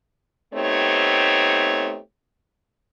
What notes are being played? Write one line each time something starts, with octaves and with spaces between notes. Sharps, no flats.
A3 B3 C4 D#4 G4 C#5